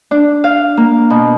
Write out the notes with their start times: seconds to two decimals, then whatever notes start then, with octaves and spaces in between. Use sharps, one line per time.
0.11 D4
0.44 F5
0.77 A#3
1.10 B2